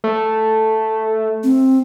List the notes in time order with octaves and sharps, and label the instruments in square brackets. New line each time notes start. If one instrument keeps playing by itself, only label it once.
[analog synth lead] A3
[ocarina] C4